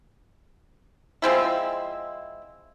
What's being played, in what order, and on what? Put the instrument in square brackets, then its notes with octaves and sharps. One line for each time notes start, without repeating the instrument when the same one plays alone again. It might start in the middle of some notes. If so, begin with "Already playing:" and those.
[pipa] F3 G#3 C4 E4